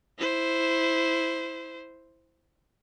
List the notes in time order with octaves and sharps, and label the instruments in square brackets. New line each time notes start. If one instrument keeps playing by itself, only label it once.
[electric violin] E4 C5